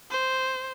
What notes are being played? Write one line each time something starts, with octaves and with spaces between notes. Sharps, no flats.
C5